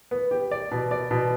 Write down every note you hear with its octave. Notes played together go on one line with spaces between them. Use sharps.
B3
G4
D5
B2
D5
B2